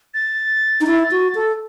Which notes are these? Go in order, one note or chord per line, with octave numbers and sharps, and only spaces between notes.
A6
D#4
E4
F#4
A4